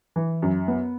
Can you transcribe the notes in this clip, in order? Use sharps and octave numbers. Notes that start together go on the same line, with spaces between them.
E3
F#2
B3